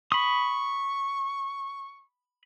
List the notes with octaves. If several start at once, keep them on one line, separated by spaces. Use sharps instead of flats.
B5 C#6 D#6